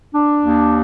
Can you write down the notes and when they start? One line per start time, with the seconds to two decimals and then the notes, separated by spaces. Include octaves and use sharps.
0.14 D4
0.42 D#2